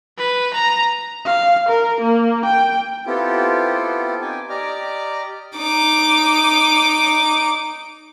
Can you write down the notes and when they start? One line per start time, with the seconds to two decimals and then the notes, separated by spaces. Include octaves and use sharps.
0.18 B4
0.54 A#5
1.25 F5
1.69 A#4
2.01 A#3
2.45 G5
3.07 B3 C4 E4 F4 G4 A4
4.21 D#4 G5 G#5 D6
4.50 G4 D5 D#5 A#5 D6 F6
5.58 D#4 D6